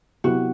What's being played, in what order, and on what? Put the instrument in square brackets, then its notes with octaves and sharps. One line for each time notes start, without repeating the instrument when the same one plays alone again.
[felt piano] C3 F#3 B3 E4 G4 [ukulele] F#4